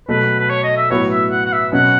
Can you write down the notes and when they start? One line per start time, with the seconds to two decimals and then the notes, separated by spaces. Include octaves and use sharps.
0.08 B2 F#3 A3 B4
0.39 B4
0.50 C#5
0.64 D#5
0.77 E5
0.90 A2 F#3 B3 F#4 B4 C#5
1.11 E5
1.31 F#5
1.45 F#5
1.52 E5
1.72 B2 F#3 C#4 F#5